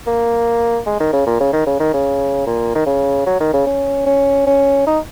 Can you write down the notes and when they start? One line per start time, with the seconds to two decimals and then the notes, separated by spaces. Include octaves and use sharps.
0.07 A#3
0.86 G#3
1.00 D#3
1.13 C#3
1.26 A#2
1.40 C#3
1.53 D#3
1.66 C#3
1.80 D#3
1.94 C#3
2.46 A#2
2.75 D#3
2.86 C#3
3.26 F#3
3.40 D#3
3.53 C#3
3.66 C#4
4.06 C#4
4.47 C#4
4.87 D#4